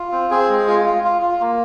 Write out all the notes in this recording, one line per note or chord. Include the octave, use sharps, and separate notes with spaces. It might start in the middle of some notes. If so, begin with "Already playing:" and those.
Already playing: F4
C4
C4 G#4
G#3
F4
F4
F4
F4
A#3